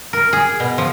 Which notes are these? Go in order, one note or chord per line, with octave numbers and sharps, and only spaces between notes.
A#4
G#4
B2
F3